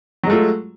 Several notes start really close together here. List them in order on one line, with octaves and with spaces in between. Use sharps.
F#3 G#3 A3 F4